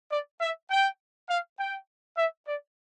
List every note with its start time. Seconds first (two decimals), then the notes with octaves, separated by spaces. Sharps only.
0.10 D5
0.41 E5
0.70 G5
1.29 F5
1.59 G5
2.17 E5
2.47 D5